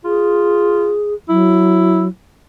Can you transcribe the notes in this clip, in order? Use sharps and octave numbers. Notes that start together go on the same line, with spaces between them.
F4 G#4
F#3 E4